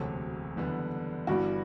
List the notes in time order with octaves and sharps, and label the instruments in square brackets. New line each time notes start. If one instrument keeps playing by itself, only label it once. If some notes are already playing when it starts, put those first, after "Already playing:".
Already playing: [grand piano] E1 D2 C3 F#3 A3 [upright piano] A4
[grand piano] F#1 E2 D3 G3 B3
[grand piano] G1 G2 E3 G3 B3 [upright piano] F#4